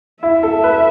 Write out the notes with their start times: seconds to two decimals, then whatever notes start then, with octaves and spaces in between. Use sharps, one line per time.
0.23 E4 E5
0.43 A4
0.64 B4